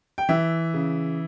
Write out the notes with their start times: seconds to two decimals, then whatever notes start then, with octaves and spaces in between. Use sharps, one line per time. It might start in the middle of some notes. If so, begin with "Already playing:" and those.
0.18 G5
0.29 E3 E5
0.74 C#3